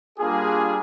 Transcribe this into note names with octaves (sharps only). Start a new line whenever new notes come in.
G3 A#3 D4 F4 G#4